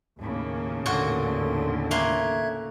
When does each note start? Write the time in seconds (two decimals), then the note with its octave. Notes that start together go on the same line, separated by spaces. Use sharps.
0.19 D#2 A2 C#3 A#3
0.86 D#2 A#2 D3 F#4 A4 C6
1.91 A3 A#3 E5 C6 F#6 G#6